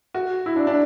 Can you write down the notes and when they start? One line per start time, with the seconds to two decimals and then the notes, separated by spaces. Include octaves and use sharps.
0.14 F#4
0.46 E4
0.56 D4
0.67 D4